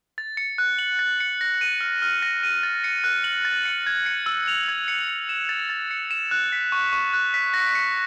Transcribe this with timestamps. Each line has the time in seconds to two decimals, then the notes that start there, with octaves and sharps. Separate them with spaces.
0.18 A6
0.37 C#7
0.58 F#6
0.79 F#7
0.99 A6
1.20 C#7
1.41 A#6
1.61 D#7
1.81 F6
2.02 F6
2.22 A#6
2.43 D#7
2.63 A6
2.84 C#7
3.04 F#6
3.24 F#7
3.45 A6
3.65 C#7
3.86 G#6
4.06 C#7
4.26 E6
4.48 F7
4.68 G#6
4.88 C#7
5.08 C#7
5.29 E7
5.49 A6
5.69 A6
5.91 C#7
6.11 E7
6.31 F#6
6.52 B6
6.72 C#6
6.92 C#6
7.13 F#6
7.34 B6
7.54 A#6
7.75 C#7